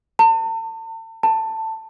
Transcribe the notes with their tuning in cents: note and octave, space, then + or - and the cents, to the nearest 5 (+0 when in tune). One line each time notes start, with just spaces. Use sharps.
A5 +40
A5 +15